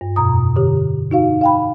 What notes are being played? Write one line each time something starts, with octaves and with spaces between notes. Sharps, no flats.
G2
F2 B2 A#5 D#6
D3 G4
D#4 F#4 F5
F5 G5 B5